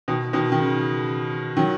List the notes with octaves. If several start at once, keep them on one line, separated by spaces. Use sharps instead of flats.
B2 D#3
B2 D#3
D#3
C#3
D#3 F#3